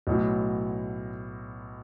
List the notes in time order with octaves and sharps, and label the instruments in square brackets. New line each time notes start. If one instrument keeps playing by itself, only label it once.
[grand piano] B1 A2 F#3